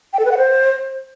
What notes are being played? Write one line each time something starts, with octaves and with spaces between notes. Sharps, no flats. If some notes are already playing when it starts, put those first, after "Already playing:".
G5
A4
B4
F#5
C5